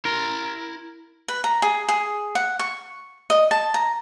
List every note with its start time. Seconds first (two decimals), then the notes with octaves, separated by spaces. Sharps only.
0.05 E4 A#4 C6
1.28 B4
1.44 A#5
1.62 G#4
1.89 G#4
2.35 F#5
2.59 C#6
3.30 D#5
3.51 A5
3.74 A#5